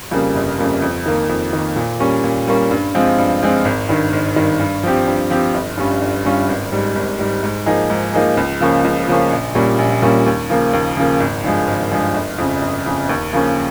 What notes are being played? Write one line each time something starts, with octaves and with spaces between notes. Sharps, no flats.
F2 C#3 G3 A#3
G1
F2 C#3 G3 A#3
F2
D#3 A#3
F2
D#3 A#3
A#2
G3 A#3 C#4
A#2
G3 A#3 C#4
G2
F3 G#3 C4 F4
G2
F3 G#3 C4 F4
G#1
G2 D#3
G#1
G2 D#3
G2
F3 C4 G4
G2
F3 C4 G4
G1
G2 G3 C#4 F4
G1
G2 G3 C#4 F4
G#1
G#2 G3
G#1
G#2 G3
G#2
F3 A#3 D#4 G#4
G#2
F3 A#3 D#4 G#4
C#2
C#3 F3 A#3 C#4
C#2
C#3 F3 A#3 C#4
A#1
A#2 G3 A#3 C#4
A#1
A#2 G3 A#3 C#4
D#2
C#3 F3 A#3
D#2
C#3 F3 A#3
G#1
G2 F3 G#3
G#1
G2 F3 G#3
G1
F2 C#3
G1
F2 C#3
D#2
C#3 F3 A#3 C#4